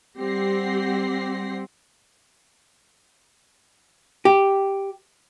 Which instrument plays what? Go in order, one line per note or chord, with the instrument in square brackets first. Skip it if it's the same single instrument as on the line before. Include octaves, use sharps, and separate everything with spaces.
[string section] G3 C4 G4 F#5 A#6 C7
[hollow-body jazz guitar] G4